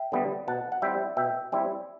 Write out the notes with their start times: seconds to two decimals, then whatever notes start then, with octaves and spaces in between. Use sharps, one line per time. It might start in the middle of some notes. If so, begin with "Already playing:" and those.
Already playing: E5 G5
0.12 D3 G3 B3
0.48 B2 F#5 A5
0.72 F#5
0.82 G3 C4 E4 E5 G5
1.17 B2 E5 G5
1.52 G3 C4 E4